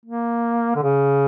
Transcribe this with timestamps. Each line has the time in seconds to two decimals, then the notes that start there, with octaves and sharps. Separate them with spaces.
0.06 A#3
0.76 D3
0.83 C#3